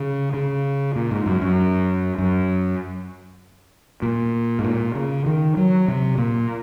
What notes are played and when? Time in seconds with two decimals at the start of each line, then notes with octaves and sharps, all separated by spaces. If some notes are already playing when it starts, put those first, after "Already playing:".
Already playing: C#3
0.34 C#3
0.96 A#2
1.11 G#2
1.26 F#2
1.41 F#2
2.18 F#2
4.02 A#2
4.59 G#2
4.64 A#2
4.95 C#3
5.26 D#3
5.57 F#3
5.88 C3
6.18 A#2